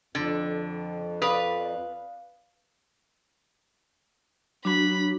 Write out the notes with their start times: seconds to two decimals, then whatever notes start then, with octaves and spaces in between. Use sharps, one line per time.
0.15 F2 D3
1.22 B4 D5 F5 D#6
4.65 F#3 D4 F#4 B5